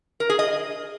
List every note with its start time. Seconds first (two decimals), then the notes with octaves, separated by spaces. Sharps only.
0.20 A#4
0.29 G#4
0.39 D#5